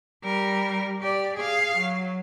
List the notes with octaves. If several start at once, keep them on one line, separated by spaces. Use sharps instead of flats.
G3 A#4
G4 D5
G#4 F5
F#3